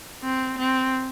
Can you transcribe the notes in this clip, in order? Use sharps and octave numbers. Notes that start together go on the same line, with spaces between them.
C4
C4